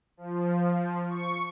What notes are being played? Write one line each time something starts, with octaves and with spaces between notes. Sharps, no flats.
F3
C#6